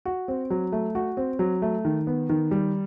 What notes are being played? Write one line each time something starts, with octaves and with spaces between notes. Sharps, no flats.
F#4
C4
F#3
A3
F#4
C4
F#3
A3
D#3
B3
D#3
G3